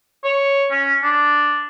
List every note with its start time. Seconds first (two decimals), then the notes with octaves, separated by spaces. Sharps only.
0.24 C#5
0.71 C#4
1.03 D4